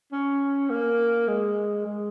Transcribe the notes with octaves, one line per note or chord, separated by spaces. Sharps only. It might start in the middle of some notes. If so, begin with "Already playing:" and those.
C#4
A#3
G#3
G#3